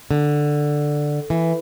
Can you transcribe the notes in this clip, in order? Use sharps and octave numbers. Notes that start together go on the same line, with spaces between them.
D3
E3